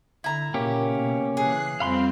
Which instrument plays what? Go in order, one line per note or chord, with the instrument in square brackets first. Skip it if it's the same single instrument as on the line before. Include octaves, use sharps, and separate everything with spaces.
[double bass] D3 [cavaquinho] E4 A#5
[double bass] A#2 C#3 [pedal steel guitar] A#3 C#4 G4
[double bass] B2
[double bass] C#3 E3 [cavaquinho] G#4 [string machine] F#6 C7
[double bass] F2 G3 [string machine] C4 [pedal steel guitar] F5 B5 C6